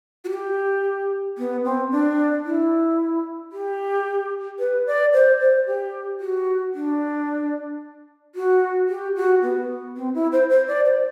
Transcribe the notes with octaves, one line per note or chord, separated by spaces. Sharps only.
F#4
G4
B3
C4
D4
E4
G4
B4
D5
C5
C5
G4
F#4
D4
F#4
G4
F#4
B3
C4
E4
C5
C5
D5
C5